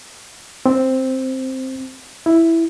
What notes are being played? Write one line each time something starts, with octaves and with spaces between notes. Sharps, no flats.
C4
E4